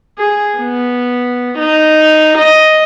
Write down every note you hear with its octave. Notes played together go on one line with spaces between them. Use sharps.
G#4
B3
D#4
D#5